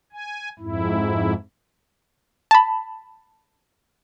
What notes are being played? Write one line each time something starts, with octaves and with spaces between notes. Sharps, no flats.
G#5
F2 G#2 E4
A5 B5